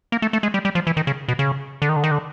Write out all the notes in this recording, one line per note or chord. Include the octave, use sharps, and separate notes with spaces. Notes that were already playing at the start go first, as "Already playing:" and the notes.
A#3
A3
A3
G#3
G3
G3
F3
E3
D#3
C#3
B2
C#3
D3
D#3
D3
D#3
D3